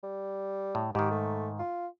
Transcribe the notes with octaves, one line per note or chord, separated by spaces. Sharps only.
G3
A2
G#2 D#3 G4
A3
F4